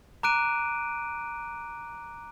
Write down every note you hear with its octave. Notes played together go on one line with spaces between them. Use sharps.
A#5 D6 F#6 D7 D#7